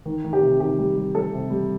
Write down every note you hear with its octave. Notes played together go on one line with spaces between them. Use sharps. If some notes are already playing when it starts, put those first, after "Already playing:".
D#3
D#3
G4
C3
D#3 G4
G3
G3
G3 A4
C3
G3